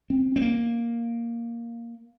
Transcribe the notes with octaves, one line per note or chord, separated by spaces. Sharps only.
C4
C4
A#3